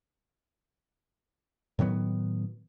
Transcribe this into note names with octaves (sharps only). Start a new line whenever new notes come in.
A2 D#3 F#3 B3